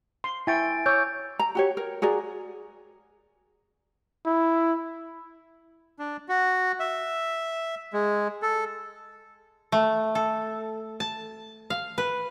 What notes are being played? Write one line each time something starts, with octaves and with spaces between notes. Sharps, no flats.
C6
E4 G5 G#5 C#6 A6 D7
C#5 D6 E6 G6
A#5
F#4 G4 C#5
A#4
F#4 G#4 A#4 D5
E4
D4
F#4
E5
G#3
A4
A3
A4
A5
F5
B4